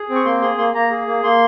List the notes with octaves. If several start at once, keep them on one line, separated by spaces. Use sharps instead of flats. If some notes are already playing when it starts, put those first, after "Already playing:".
Already playing: G#4
C4
C#6
A#3 C6
G#4 C6
A#3 C6
A#3 A#5
G#4
A#3
A#3 C6